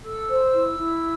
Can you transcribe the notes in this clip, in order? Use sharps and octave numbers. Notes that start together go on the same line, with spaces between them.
A4 E6
C5
E4
E4